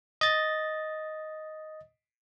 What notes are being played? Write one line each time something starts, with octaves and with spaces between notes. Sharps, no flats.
D#5 A6